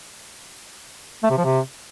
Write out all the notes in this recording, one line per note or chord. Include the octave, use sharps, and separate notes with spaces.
A3
C3
F3
C3